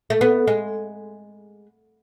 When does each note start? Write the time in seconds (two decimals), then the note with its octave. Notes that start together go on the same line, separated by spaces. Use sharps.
0.10 A3
0.21 B3
0.47 G#3